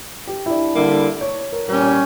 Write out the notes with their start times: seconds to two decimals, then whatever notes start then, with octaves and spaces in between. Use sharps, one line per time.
0.27 G4
0.46 E4
0.50 D4
0.75 D3 G3 A#3 E4
1.21 C#5
1.52 A#4
1.68 A#2 G3 C#4 G4 A#4
1.84 C#5